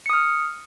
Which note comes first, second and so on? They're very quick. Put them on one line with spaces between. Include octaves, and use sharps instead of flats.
C#7 D#6 F6